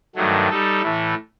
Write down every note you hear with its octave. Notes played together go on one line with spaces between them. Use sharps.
G2 D#3 F#3 A3
G3 D#4 A4
A2 E3 A3